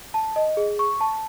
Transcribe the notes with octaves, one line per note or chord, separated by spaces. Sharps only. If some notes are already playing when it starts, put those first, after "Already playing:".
A5
D#5
G#4
C#6
A5